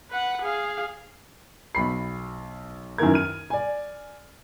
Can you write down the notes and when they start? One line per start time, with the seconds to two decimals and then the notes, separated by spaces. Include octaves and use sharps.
0.11 B4 F#5
0.42 G#4 F5
1.75 B1 B5 C7
2.98 F#2 D#3 E3 A#4 G#6
3.14 F6 D#7
3.50 D5 G#5